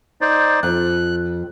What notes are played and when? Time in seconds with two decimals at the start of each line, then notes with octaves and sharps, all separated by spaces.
0.21 D#4 C5 D5
0.63 F2 F#6